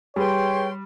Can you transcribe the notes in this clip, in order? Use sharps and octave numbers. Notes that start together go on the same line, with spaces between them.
G3 G#4 B4 C#5 G5 C6